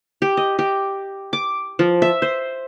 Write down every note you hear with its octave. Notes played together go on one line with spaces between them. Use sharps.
G4
D#5
G4
D6
F3
E5
C5